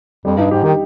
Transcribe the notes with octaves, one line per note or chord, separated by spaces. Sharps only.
F2 G3
G2 D#4
G#2 G4
D#3 G4